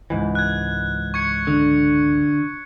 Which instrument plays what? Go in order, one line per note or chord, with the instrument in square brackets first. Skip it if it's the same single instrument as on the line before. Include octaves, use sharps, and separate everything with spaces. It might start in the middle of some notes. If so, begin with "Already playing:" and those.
[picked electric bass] C#2 G#2 E3
[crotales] F#6 G#6
C#6 G#6 C#7
[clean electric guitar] D3